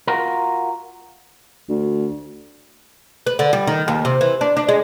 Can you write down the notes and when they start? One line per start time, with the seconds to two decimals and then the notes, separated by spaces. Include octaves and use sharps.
0.07 F4 F#4 A#4
1.69 D2
3.27 B4
3.39 D3
3.53 G3
3.67 D#3
3.88 D#2
4.05 C3
4.21 E3
4.41 D4
4.57 D4
4.69 G#3